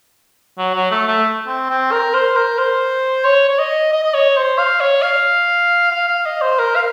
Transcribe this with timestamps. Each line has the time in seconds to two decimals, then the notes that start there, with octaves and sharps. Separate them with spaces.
0.58 F#3
0.75 F#3
0.91 A3
1.07 A3
1.47 C4
1.70 C4
1.92 A#4
2.14 C5
2.36 A#4
2.58 C5
3.25 C#5
3.48 C#5
3.59 D#5
3.92 D#5
4.04 D#5
4.14 C#5
4.37 C5
4.58 F5
4.80 C#5
5.02 F5
5.91 F5
6.08 F5
6.25 D#5
6.41 C5
6.59 A#4
6.76 F5